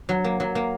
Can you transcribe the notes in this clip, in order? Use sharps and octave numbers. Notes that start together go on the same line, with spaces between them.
F#3
A#3
F#3
A#3